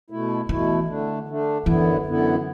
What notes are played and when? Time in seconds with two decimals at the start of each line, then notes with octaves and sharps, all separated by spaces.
0.10 B2 A3 E4
0.49 B2 E3 A3 E4
0.88 D3 A3 D4
1.27 D3 A3 D4
1.66 F#2 D3 E3 B3 E4
2.05 F#2 D3 B3 E4